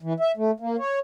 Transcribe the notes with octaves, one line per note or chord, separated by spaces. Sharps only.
E3
E5
A3
A#3
C#5